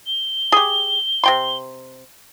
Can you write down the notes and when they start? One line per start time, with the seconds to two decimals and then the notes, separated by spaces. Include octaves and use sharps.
0.06 G7
0.52 G4 G#4
1.24 C3 G5 C6